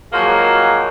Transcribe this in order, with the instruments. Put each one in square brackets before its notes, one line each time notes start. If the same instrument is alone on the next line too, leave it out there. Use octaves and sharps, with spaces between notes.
[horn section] F3 F#3 G#3 A#3 F#4 G#4